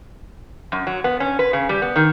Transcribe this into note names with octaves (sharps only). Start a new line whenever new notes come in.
F#2
F#3
B3
C#4
B4
C#3
G3
B3
D#3